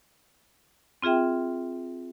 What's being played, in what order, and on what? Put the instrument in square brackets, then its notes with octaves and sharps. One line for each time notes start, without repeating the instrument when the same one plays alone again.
[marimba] C4 F4 G#4 E5 G5